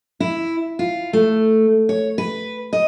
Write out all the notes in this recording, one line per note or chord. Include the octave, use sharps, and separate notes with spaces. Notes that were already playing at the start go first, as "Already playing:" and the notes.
E4
F4
A3
C#5
B4
D#5